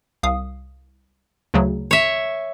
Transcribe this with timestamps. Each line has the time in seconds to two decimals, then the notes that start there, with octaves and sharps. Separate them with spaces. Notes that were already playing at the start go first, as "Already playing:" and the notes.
0.23 C2 F5 D#6
1.54 D2 C#3 F#3
1.91 C#5 E5